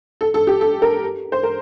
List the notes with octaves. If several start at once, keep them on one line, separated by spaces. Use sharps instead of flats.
A4
A4
G4
A4
A#4
C5
A#4